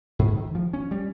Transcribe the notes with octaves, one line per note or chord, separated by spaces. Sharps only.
G#2
D#3
F3
C#4
G3